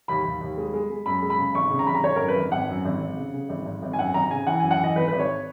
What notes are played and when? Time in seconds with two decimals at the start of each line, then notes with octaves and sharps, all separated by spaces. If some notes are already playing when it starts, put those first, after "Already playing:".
0.08 D#2 B5
0.25 D#2
0.41 D#2
0.57 G#3
0.73 G#3
0.90 G#3
1.06 F#2 B5
1.22 G#3
1.30 B5
1.38 C#3
1.55 G#1 C#6
1.70 C#3
1.79 A#5
1.87 G#1 B5
1.95 A#5
2.04 G#1 C#5
2.16 F#2 A#4
2.28 B4
2.36 G#1
2.52 G#1 F#5
2.69 F#2
2.85 G#1
3.01 G#1
3.17 C#3
3.34 C#3
3.49 G#1
3.66 G#1
3.82 G#1
3.93 G#5
3.98 F#2 F#5
4.14 G#1 A#5
4.31 C#3 G#5
4.46 E3 F#5
4.60 F#2 G#5
4.71 F#5
4.80 E3 D#5
4.95 G#1 B4
5.08 G#1 B4
5.19 C#5